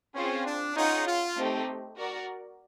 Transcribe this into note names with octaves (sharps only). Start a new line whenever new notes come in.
C4 C#4 F4 G#4 C5
D4
C#4 D#4 F4 G#4 C#5 F#5
F4
A3 C4 D#4 G4
F#4 A#4 D5